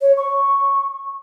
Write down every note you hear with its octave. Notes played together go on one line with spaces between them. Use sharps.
C#5
C#6